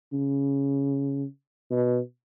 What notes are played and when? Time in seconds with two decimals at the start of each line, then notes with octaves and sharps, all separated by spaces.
0.13 C#3
1.71 B2